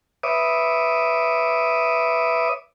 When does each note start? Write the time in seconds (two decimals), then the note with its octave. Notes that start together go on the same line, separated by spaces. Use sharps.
0.23 B4 C#5 E5 D6 D#6